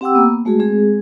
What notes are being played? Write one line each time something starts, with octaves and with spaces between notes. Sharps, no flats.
C4 G4 F#5 G5 D6 E6
A#3 B3
G#3 A3 F#4 G#4
G#3 C4 G#4